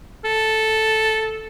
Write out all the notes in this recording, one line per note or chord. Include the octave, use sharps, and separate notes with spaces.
A4